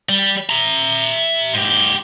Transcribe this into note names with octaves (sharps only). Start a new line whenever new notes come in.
G3
E5 A#5
G#2 G4